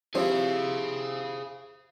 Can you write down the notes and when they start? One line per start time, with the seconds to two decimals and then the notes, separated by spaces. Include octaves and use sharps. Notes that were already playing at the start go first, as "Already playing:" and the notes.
0.15 F3 C4 E4 G4 G#4 F5